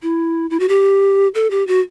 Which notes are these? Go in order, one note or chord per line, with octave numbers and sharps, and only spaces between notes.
E4
E4
F#4
G4
A4
G4
F#4